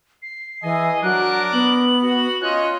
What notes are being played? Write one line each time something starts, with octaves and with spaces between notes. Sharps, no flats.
C7
E3 G#4 D#5 G#5
F#3 D4 A#4 D6 F#6
B3 F#7
F#4
C#4 F4 C#5 D#5 F#6